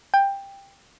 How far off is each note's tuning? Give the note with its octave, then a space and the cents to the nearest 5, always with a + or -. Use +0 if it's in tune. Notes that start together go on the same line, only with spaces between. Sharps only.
G5 +15